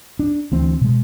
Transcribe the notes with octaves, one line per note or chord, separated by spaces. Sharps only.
D4
D2 E3 C4
B2 G#3